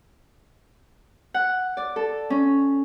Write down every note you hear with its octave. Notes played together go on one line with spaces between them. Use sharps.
F#5
D5
A4
C#4